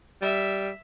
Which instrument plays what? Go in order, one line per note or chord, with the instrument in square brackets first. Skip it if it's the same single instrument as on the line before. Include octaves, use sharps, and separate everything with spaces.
[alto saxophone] G3 [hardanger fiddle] E5